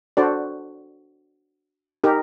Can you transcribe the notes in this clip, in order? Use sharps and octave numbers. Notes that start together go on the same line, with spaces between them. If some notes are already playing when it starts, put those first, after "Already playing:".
D4 F#4 A4 C5 D5
D#4 G4 A#4